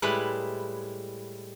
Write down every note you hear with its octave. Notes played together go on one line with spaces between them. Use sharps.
A2 G3 G#3 E4 B4